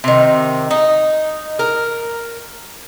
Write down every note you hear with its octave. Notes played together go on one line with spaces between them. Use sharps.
C3 D#3
D#4
A#4